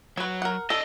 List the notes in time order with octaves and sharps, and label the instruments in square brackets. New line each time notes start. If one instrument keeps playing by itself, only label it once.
[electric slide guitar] F#3 [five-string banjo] B4 C#5
[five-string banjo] A#4 F#5
[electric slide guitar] D4 D#5 [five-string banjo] A4